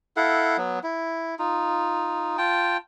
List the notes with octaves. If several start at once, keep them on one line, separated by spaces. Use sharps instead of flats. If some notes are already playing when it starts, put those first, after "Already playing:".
E4 A4 F5 F#5
F#3 B3
E4
D#4 F4
F4 G5 A5